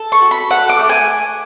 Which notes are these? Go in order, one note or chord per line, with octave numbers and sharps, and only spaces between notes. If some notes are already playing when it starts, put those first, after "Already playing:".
Already playing: A4
C#6
F#4
B5
A4 F#5
D6
A3
G#5